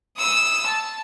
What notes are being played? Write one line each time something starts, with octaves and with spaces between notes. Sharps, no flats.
D#6 E6
A5